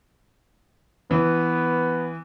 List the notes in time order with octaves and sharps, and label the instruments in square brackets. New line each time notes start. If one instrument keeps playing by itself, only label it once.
[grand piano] E3 [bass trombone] B3